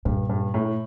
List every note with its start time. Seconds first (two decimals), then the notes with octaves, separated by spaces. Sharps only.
0.05 G2 A#2
0.29 G2
0.54 A2